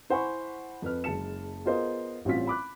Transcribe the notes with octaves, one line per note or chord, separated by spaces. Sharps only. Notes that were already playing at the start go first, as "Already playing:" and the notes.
E4 C5 F#5 G#5 B5 C#6
F2 B4 F6
F#1 G#3 A5 C#7 E7
B3 F4 G#4 A#4 C5 D#5
A1 G3 C4 C#4 F4 B6
B5 D6 F#6